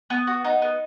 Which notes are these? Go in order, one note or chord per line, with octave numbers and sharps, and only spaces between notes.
B3
F#4
D#4
B3